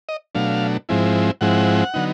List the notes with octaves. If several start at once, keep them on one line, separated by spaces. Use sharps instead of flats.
D#5
B2 F#3 A3 D4 F5
G#2 F3 G#3 C4 E4
G#2 F3 G#3 C4 E4 F#5
D3 F#3 B3 D#4